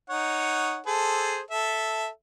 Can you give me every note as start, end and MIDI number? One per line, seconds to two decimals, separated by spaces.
0.10 0.79 63
0.10 0.79 73
0.10 0.79 78
0.86 1.41 68
0.86 1.41 69
0.86 1.41 72
1.51 2.07 69
1.51 2.07 76